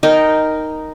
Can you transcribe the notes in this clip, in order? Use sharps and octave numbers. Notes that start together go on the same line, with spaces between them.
D#4 A#4 D#5 G5